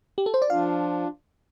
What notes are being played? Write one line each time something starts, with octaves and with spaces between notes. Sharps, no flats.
G4
A4
C5
D5
F3 D4 F4 F5